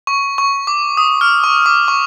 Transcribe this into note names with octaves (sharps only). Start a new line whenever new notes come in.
C#6
C#6
D6
D#6
F6
C#6
D6
C#6